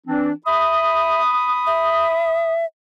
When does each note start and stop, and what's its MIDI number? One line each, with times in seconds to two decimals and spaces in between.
0.07 0.31 52
0.07 0.31 60
0.07 0.31 62
0.46 1.21 76
0.46 2.53 83
0.46 2.53 87
1.67 2.65 76